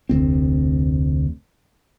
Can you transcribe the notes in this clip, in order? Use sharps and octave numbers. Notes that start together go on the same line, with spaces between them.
F1 D2 C4